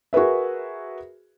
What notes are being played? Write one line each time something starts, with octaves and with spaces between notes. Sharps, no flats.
F#4 G#4 A#4 B4 E5